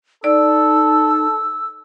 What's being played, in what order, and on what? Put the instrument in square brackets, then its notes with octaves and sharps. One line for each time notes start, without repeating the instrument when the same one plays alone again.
[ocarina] D#4 [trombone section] A4 [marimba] D5 [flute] E6